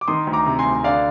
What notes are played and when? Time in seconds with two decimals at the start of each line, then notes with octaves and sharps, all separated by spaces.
0.01 D6
0.08 D#3 C6 D#6
0.27 D2
0.33 A#5 D6
0.46 C3
0.59 G#5 C6
0.65 D2
0.84 D3 D5 F5